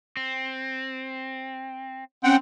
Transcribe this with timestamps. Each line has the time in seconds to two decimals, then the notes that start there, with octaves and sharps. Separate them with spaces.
0.17 C4
2.24 C4 C#4 F#5 G5